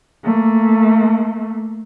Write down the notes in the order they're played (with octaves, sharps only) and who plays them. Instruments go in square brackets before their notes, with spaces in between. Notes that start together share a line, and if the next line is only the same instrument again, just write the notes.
[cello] A3 A#3